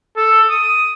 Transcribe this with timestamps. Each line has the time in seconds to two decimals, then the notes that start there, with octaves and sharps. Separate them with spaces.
0.17 A4
0.50 D#6